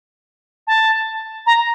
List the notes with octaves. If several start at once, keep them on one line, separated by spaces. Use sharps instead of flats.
A5
A#5